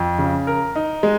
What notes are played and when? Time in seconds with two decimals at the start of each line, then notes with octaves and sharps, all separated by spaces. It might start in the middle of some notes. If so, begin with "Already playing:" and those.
Already playing: F2
0.19 C#3
0.47 A#4
0.76 D#4
1.03 G#3